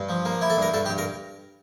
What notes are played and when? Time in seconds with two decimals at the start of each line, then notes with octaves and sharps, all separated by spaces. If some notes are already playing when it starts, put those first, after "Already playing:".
Already playing: G2
0.09 F3
0.25 A#3
0.41 E4
0.50 A4
0.57 G2 A#4
0.74 G2 A4
0.86 G4
0.90 G2
0.98 A#4